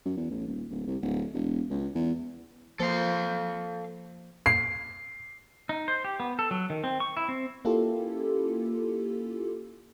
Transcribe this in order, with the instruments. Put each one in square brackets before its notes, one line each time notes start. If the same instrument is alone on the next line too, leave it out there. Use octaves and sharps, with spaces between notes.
[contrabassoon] F#2
E2
A1
D#1
D1
C2
D1
E1
C#2
E2
[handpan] F3 A#3 C5 [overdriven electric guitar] A4 F5
[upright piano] C7
[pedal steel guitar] D#4
C5
G4
B3
A4
F#3
D#3
C4
C#6
E4
C4
[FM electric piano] A#3 C#4 E4 F4 G4 A4